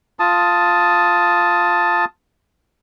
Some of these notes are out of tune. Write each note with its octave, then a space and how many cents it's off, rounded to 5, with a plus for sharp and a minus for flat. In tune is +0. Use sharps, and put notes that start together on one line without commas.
F4 +0 A5 +0 D#6 +10